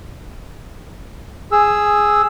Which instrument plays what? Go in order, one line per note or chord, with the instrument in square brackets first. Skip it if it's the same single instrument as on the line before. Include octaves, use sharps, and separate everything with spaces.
[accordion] G#4 E6